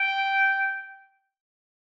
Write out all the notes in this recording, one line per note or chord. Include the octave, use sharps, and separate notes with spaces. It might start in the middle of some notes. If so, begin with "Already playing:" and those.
Already playing: G5